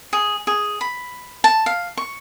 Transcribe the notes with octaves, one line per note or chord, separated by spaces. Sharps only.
G#4
G#4
B5
A5
F5
C#6